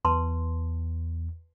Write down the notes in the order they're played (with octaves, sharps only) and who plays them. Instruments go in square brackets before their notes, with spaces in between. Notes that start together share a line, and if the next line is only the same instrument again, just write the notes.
[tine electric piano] E2 [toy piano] B4 A5 C6